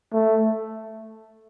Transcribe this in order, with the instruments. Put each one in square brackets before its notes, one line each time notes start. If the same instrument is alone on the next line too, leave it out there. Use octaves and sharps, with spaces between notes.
[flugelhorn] A3